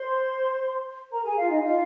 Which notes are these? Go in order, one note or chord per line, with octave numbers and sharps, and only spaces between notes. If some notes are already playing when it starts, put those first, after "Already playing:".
Already playing: C5 C6
A#4 A#5
G#4 G#5
F4 F5
D#4 D#5
F4 F5